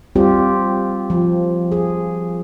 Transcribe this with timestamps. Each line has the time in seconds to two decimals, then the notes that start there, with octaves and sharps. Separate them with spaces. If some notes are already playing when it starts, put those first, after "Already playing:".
0.15 G3 C4 F4 G4
1.10 F3
1.72 G#4